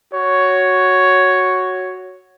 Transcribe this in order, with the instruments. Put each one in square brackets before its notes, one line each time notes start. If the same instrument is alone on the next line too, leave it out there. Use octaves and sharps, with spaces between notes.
[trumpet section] F#4 C#5